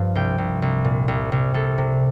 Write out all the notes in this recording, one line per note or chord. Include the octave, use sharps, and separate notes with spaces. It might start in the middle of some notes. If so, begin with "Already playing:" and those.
Already playing: G2 F3
C2 G5
C2
C2
A#2
C2
C2
C2 A4
C3